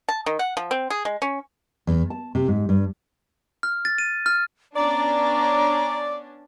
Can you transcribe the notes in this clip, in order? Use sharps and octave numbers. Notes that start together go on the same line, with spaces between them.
A5
D#3
F#5
F3
C4
G#4
G#3
C#4
E2
A5
C3
G#2
G2
F6
A6
D#7
F6
B3 C#4 D4 D5 A#5